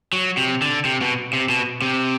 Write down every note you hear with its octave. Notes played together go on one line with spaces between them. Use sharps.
F#3
C3
D3
C3
B2
C3
B2
C3